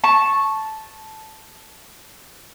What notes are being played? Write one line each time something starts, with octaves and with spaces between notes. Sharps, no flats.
A5 C#6